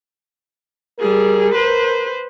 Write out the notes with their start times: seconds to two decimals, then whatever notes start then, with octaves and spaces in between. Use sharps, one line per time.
1.00 G3 G#4 A#4
1.55 B4 C5